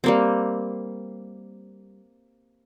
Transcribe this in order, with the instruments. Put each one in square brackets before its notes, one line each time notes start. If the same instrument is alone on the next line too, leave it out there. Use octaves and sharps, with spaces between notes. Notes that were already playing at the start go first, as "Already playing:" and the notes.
[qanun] G3 A#3 C4